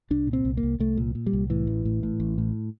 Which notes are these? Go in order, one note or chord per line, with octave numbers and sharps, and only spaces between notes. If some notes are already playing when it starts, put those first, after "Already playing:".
C2 D4
A#2
C4
C2
A#3
C2
C2 A3
A#2
A#2
G3
C2
A2 E3
A1
A2
A2
A1
A2